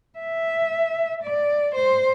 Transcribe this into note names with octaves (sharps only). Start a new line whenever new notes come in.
E5
D5
C5